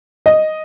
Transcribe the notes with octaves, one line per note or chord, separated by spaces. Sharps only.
D#5